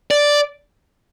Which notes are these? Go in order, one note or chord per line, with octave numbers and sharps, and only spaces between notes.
D5